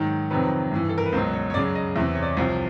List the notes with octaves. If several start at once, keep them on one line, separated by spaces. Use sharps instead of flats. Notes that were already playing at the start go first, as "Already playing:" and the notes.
Already playing: G#2 D#3 F#3
F2 C3 D#3 F#3 B4
G2 E3
A4
A#4
B4
C#2 B2 F#3 C5
C#5
C#5
F#2 C#3 F#3 D5
D#5
E2 C3 E3 E5
C#5
D5
C2 C3 F3 C#5